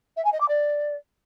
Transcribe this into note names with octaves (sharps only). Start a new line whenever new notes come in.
E5
G#5
D#5
D6
D5